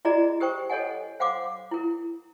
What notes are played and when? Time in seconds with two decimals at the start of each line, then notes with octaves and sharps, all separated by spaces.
0.05 E4 F#4 G#4 D5 D#5 A#5
0.40 G4 A#4 C5 G5 C#6
0.69 A4 C#5 D#5 F#5 G#5
1.20 C5 F5 F#5 C6 D6
1.71 E4 A#4